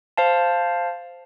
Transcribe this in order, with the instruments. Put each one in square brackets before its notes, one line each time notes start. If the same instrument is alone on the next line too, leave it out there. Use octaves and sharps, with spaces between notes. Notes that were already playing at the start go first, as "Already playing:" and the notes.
[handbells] C5 F5 A5